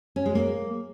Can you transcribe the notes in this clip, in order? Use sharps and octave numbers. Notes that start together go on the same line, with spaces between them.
C#4
G#3
A#3